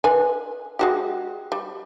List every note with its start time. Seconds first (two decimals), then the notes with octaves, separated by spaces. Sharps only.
0.04 B4 G#5
0.79 G#3 F#4 G4
1.52 G3